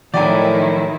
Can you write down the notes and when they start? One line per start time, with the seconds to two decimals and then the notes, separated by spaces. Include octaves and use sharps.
0.14 A2 D#3 F3 F#3 E4 D5 G5 G#5